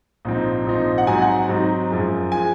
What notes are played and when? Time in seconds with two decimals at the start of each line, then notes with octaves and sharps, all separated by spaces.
0.25 A#1 G#2 F3 C4 D#4
0.66 A#1 G#2 F3 C4 D#4
0.98 F#5
1.07 G#2 F#3 C4 D#4 G#5
1.22 F#5
1.49 G#2 F#3 C4 D#4
1.91 F#2 F3 G#3
2.32 F3 G#3 G#5